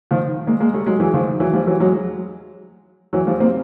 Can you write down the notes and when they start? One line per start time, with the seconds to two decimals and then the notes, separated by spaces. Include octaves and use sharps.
0.11 D#3 F3
0.47 G#3 A#3
0.60 G#3 A#3
0.73 G3 A3
0.86 F#3 G#3
1.00 E3 F#3
1.14 D#3 F3
1.40 E3 F#3
1.53 F3 G3
1.67 E3 F#3
1.80 F#3 G#3
3.13 E3 F#3
3.27 F3 G3
3.40 A#3 C4